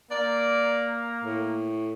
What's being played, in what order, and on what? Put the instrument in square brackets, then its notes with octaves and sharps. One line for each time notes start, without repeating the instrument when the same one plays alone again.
[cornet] A#3 [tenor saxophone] D5
[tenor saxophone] A2